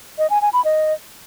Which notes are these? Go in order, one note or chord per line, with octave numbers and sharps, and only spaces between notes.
D#5
G#5
G#5
B5
D#5